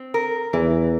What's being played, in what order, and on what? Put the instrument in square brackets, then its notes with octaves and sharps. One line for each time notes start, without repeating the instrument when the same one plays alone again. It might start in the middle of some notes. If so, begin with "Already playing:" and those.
Already playing: [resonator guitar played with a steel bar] C4
A#4
[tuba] E2 [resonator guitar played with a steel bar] E3